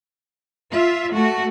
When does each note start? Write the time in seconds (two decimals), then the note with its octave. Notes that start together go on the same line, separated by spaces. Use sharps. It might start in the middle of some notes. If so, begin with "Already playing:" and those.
0.72 F4 E5
1.14 A3 F#4